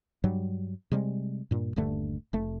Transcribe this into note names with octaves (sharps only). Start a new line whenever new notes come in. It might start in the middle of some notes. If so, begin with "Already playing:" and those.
G2 F#3 G3
C3 G3 G#3
G2 A#2
D#1 G2 D3 A3
F1 A3